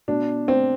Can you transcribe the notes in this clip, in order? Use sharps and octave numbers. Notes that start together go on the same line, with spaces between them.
B2 D4
C4